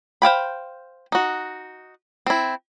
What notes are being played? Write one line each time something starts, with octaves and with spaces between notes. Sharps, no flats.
C5 F5 G5 B5
D#4 F#4
C4 E4